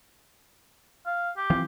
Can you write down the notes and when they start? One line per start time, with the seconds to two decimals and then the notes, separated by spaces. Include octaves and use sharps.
1.06 F5
1.37 G4
1.50 E3 F3 C4